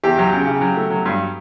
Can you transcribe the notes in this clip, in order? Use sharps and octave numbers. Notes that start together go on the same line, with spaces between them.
E2 G4
F#3
C#3
C#3
F#3
A3
F#3
G2